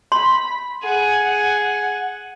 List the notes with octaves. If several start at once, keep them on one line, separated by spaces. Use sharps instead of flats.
B5 C6
G#4 F#5